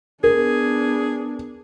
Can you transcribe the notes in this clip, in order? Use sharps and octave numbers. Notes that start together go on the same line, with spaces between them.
B3 D4 G#4 A#4